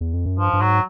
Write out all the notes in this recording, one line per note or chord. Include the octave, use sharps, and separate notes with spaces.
E2
F2
F#2
G2 F3
G2
G#2 F#3